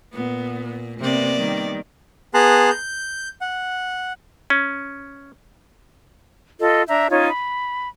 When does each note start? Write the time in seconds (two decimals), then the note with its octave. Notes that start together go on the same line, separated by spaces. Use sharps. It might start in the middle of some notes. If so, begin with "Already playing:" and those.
0.13 A#2 B3
1.00 C3 A#3 B3 D5
1.37 D#3 G3
2.34 B3 G#4 A5 A#5 C6 F#6
2.70 G6
3.41 F#5
4.50 C#4
6.60 F4 A4 D#5
6.87 D4 E5 A#5 G6
7.10 C#4 D#4 F4 C#5
7.29 B5